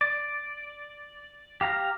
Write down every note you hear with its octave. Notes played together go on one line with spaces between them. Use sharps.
D5
G4 F5 A#5 F6